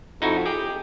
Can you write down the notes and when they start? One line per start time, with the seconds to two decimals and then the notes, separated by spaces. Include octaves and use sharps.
0.22 F2 D#4 E4 F#4
0.46 G4 G#4